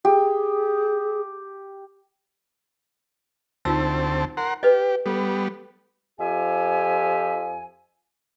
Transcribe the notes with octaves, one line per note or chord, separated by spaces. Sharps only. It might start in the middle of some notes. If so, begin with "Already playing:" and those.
G4 G#4
D2 C4 D#4 F4 A5 E6
A#4 F#5 C6
G4 B4 D#5
G3 B3 A4
F2 F3 G4 E5 G#5